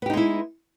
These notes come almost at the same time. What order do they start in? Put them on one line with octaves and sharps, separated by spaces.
B3 G4 D#4 G#3 E4